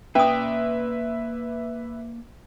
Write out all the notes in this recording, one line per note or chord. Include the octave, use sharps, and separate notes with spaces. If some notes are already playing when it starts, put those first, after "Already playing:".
A#3 C#4 B4 D5 E5 D#6